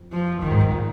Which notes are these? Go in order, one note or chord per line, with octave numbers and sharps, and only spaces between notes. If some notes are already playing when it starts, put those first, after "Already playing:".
Already playing: F2
F3
F2 D#3
G#2
G#2
A#2